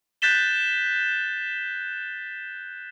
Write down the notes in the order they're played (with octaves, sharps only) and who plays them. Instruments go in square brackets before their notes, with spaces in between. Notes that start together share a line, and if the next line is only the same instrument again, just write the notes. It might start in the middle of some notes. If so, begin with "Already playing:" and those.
[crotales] F#6 G6 A6 B6 E7 G7